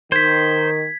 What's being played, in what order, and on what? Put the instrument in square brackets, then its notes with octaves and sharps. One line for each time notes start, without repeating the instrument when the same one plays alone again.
[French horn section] D#3 [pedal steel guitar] C5 [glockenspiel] G#6 B6